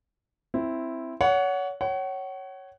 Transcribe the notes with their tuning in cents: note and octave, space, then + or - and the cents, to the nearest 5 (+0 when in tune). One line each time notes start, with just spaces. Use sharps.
C4 +0 E4 +0
C#5 +30 F#5 +0
C#5 -5 F#5 +35